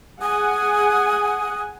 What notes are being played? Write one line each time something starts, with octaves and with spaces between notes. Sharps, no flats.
G#4 F#5 G#5 D#6